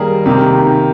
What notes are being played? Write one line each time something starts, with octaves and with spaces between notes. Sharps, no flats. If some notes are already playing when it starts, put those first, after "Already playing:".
Already playing: D#3 G3 A#3 G#4 A#4
C3 D#3 A#3